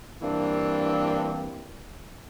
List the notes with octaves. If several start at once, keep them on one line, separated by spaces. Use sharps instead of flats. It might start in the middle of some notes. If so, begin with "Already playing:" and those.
G2 E3 A#3 C4 D4